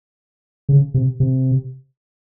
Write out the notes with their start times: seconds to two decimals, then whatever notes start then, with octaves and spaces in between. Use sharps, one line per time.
0.69 C#3
0.94 C3
1.20 C3